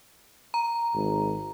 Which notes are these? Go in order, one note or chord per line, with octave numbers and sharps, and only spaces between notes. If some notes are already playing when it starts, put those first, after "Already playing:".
A#5
G#1